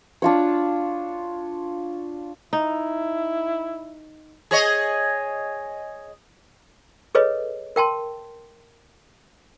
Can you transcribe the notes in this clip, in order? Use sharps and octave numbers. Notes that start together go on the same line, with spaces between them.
D4 F4 C#5
D#4 E4
G#4 C#5 D#5
G#4 A4 B4 C#5 D#5
A#4 G5 A5 C6